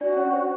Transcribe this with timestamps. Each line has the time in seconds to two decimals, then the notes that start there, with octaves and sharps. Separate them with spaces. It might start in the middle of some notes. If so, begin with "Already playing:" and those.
0.01 D4 F#4 D5
0.16 C#4 C#5
0.33 C5